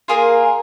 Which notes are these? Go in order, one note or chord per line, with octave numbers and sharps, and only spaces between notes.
A#3 F4 G#4 A#4